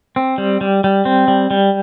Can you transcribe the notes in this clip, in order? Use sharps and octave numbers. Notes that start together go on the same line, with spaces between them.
C4
G3
G3
G3
C4
G3
G3